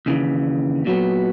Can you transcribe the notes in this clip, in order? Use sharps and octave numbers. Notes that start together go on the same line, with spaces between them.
D#2 C#3 E3
A#2 F#3 B3